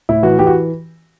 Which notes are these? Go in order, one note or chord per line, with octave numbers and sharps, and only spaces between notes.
A2 E4
E3 F#4
E3 G4
F#4